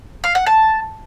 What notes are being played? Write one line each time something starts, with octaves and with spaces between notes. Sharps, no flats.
F5
F#5
A5